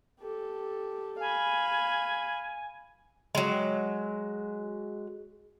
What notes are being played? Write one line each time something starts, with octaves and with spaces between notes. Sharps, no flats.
G4 A4
F5 G#5 B5
F#3 G#3